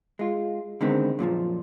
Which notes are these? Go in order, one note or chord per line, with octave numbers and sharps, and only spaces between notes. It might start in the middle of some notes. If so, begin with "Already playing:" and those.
G#3 F4
D3 D#3 G#3 B3 C4
F#2 A#2 D3 F3